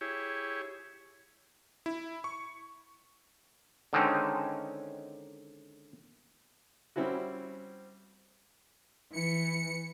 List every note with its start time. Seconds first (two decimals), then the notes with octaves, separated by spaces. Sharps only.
0.01 E4 G4 G#4 C#5
1.86 E4
2.24 C#6
3.93 D3 D#3 G#3 C4 C#4 D#4
6.96 G3 C4 C#4 E4 F#4
9.13 E3 C#7